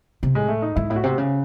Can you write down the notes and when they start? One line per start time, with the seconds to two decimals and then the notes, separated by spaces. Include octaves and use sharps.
0.23 C3
0.35 A2 G#3
0.48 A3
0.62 D#4
0.76 G#2 E4
0.90 A2 E4
0.96 F#4
1.03 C3
1.18 C#3